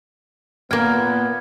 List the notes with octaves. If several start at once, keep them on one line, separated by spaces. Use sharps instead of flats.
A#2 A#3 B3 G5 F6 G#6